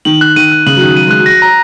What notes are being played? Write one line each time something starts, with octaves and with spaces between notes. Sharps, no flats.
D#3 F#7
F#6
D#3 D#7
F#6
C#3 F#7
F#3
D#3 F#6
F#3 D#7
G#3 F#6
F#3
A#6
A#5